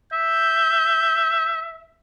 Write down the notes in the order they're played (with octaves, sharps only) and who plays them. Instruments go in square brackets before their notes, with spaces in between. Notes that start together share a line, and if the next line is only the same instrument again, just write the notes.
[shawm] E5 [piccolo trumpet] G6